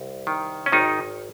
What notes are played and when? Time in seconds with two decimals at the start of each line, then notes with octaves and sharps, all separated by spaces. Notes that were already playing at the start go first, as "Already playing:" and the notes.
Already playing: C2
0.27 D#3
0.66 C#4
0.72 G#1 D#3 D#4